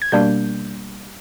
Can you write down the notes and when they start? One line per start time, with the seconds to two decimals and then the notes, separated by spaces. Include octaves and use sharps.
0.02 G#6
0.12 B2 G3 A#3 D4 G6